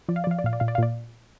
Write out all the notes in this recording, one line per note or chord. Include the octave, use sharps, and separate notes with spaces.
F3 D5
F5
D5
F3 F5
D5
A#2 F5
D5
A#2 F5
D5
F5
A#2 D5